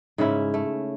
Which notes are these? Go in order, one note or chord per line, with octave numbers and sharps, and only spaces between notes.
G#2 C#3 C#4 E4
A3